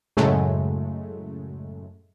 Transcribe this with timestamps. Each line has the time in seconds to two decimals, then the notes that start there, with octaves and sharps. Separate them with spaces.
0.17 F#2 A2 C#3 F#3 G#3 A3